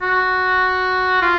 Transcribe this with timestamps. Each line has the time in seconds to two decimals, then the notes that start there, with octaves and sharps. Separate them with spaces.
0.02 F#4
1.22 F4